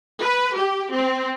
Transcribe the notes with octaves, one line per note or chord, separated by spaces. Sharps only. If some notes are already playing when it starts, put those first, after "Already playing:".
B4
G4
C4